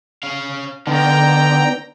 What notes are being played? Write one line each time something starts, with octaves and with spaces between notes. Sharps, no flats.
C#4 F5
D3 D#3 B3 D4 G5 A#5